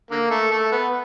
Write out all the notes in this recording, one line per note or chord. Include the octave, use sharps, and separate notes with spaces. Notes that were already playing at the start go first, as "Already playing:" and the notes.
D3 A#3
A3
A3
B3